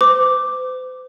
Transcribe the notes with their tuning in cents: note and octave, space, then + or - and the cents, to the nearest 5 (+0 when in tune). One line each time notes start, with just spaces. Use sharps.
C5 -45 D6 +0